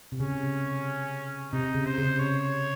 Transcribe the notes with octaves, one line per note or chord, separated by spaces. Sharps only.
C3
C#3 C#4
C3 D#4
C#3
C5
C#3
C#5